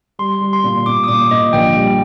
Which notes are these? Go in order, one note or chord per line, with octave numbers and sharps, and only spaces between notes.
G3 C6
G3
C6
A#2
A#2 D6
D#6
A#2 D6
A#2 D#5
A#1 G5
G3